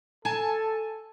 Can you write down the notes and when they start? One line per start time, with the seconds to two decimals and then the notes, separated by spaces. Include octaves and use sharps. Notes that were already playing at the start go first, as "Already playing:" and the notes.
0.25 A4 G#5 A5